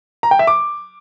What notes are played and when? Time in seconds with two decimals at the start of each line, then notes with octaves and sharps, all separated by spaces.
0.23 A#5
0.31 G5
0.39 E5
0.47 D6